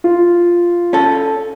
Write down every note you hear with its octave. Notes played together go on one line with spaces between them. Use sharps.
F4
C#4 A4